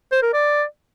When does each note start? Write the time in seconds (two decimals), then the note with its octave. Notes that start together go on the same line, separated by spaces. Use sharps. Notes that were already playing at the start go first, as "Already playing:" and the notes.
0.12 C5
0.23 A#4
0.33 D5